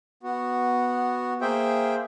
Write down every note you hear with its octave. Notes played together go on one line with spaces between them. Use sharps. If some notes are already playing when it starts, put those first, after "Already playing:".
B3 F#4
A#3 G#4 C5 E5 G5